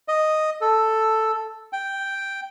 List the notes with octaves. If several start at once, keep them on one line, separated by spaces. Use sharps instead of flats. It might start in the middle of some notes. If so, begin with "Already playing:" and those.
D#5
A4
G5